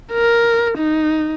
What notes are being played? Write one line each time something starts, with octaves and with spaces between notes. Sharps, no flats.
A#4
D#4